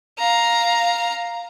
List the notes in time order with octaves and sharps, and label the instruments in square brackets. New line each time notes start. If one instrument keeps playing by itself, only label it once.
[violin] F5 A#5